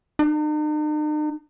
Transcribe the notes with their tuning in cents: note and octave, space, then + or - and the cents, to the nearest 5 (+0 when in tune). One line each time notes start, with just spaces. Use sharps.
D#4 -45